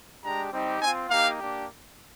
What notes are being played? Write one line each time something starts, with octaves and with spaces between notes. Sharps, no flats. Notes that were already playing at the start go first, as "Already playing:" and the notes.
G#3 D4 G4 A#5
G3 C4 D#4 G4
C4 F4 G#5
A#3 D#4 G4 F5
A#3 D4 G4